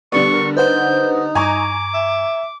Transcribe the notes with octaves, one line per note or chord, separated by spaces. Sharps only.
D3 G3 B3 C#6
A#4
D#4 B4 C5 F#5 G6
G2 G#5 A#5 C#6 D6
E5